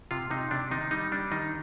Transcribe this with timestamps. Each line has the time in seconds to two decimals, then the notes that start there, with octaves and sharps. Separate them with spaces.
0.11 C3 F4
0.31 C3 D#4
0.51 C3 D4
0.71 D#3 D#4
0.91 G3 D#4
1.12 G3 D4
1.32 D#3 D#4